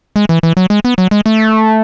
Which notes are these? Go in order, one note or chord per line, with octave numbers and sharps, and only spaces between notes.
G#3
E3
E3
F#3
G#3
B3
F#3
G#3
A3